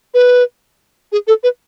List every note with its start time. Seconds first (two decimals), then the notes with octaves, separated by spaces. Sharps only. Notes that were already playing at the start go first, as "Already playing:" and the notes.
0.14 B4
1.12 G#4
1.27 A4
1.43 B4